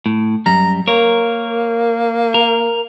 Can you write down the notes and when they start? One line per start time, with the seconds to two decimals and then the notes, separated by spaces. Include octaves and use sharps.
0.06 A2
0.46 F#2 G3 A#5
0.87 A#3 A#4 C#5
2.34 A#4